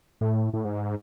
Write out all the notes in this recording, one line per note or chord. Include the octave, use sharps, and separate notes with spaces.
A2
A2
G#2